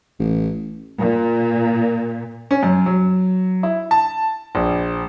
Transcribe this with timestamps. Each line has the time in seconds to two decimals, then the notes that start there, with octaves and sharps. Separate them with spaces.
0.19 A1
0.99 A#2
2.51 C#4
2.63 F#2
2.86 F#3
3.63 E4
3.91 A5
4.55 A#1